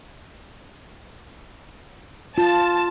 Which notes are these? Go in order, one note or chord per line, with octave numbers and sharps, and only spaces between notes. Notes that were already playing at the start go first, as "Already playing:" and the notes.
F4 A5